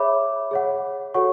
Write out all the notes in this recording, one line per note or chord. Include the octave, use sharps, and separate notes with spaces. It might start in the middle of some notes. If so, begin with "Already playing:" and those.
Already playing: G#4 C#5 E5 B5 D6
G#4 C#5 F#5
F#4 A4 C#5 F#5 C#6